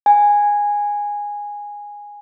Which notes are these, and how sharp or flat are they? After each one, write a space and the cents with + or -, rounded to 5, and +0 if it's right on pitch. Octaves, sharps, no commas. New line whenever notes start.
G#5 -10